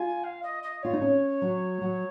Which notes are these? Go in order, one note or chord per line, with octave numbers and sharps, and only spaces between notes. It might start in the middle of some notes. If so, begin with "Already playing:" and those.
Already playing: F4 G#5
F5
D#5
D#5
F4 C#5
D#4
C#4
F#3
F#3